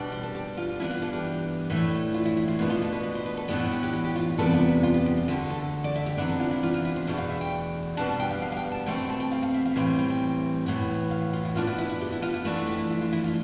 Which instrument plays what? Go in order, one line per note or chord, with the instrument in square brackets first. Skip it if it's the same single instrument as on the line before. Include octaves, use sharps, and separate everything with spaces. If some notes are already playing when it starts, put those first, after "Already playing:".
Already playing: [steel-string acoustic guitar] B2 G3 D4
C5
A4
G4
F4
G2 E3 B3 D4 E4
F4
A4
G4
A2 E3 A3 D4
F4
E4
E4
F4
B2 B3 D4 F4
F4
A4
B4
B4
C5
B4
A4
A2 E3 B3 D4 G4
F4
G4
G4
G4
G4
F4
E2 C3 G3 B3 D4 A4
F4
G4
F4
G4
G4
F4
D2 D3 A3 G4
A4
D5
E5
G4
C3 E3 B3 D4 A4
A4
F4
E4
F4
F4
E4
C5
E2 B2 A3 D4 D5
F5
E5
G5
B2 G3 B3 D4 A5
A5
G5
F5
F5
F5
G5
A5
B2 A3 C4 G5
G5
A5
G5
F5
F5
E5
F5
A2 E3 G3 C4 G5
G5
G5
A2 E3 B3
F5
F4
E4
B2 B3 D4 F4
E4
E4
E4
G4
E4
F4
E4
F2 E3 A3 D4 E4
F4
G4
E4
F4
F4
E4
F4